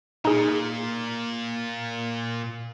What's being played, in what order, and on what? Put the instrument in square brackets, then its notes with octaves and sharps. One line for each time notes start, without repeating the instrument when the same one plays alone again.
[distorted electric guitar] A#2 [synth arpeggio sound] D#4 G#4